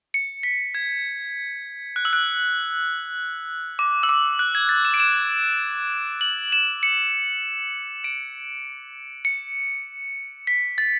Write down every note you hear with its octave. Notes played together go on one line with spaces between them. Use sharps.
C#7
B6
G#6
F#6
E6
F#6
D6
E6
D6
F#6
G#6
A6
E7
D7
E7
F#7
E7
C#7
D7
C#7
B6
A6